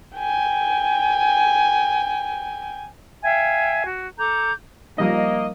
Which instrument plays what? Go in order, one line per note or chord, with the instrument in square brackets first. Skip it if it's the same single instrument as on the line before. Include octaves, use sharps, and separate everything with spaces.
[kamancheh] G5 G#5
[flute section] E5 F5 G5 G#5
F#4
A4 A#5 D6 G6
[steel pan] F3 G3 D#4 [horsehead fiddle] A#3 [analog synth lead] D#5